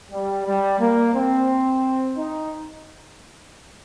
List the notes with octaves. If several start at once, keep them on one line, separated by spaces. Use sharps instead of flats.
G3
G3
A#3
C4
D#4